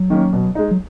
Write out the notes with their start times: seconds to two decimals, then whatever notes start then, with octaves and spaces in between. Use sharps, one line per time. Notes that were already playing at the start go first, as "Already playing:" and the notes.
Already playing: F#3
0.10 D#3 A#3 C#4
0.33 B2
0.55 G#3 D#4
0.71 F#3